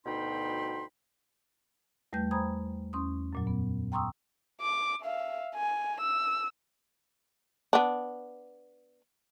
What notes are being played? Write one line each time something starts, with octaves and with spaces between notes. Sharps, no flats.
D2 B2 D#4 G5 B5 C6
E2 G3 A3 B4 G5 G6
C5 G#5 A#5 B5 D#6 G#6
E2 C#4 C6 D#6
F#2 A#2 F#3
B3
G5 A#5 C6 C#6 D#6 E6
D6
E5 F5
G#5
E6
B3 D4